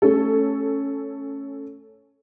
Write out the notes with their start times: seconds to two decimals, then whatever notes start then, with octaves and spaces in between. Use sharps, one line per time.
0.02 A3 C#4 A4